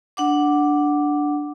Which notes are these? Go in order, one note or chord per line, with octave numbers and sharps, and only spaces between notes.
D4 F#5 D6